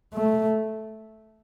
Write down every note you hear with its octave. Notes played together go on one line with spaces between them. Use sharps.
A3